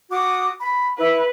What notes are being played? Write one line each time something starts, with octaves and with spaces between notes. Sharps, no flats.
F#4 D6 D#6
B5
E4 B4